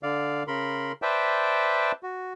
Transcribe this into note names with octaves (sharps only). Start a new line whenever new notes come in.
D3 D5 F5
C#3 A#4 B5 C6
B4 C5 D5 E5 G5 A5
F#4